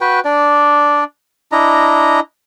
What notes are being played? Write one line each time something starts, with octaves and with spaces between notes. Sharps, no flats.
F#4 B4 G5
D4 D5
D4 E4 D#5 A#5